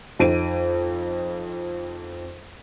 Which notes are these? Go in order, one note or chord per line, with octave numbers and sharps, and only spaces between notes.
F2 D#4 D7 D#7